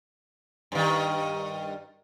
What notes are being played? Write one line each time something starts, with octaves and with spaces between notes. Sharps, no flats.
G2 D#3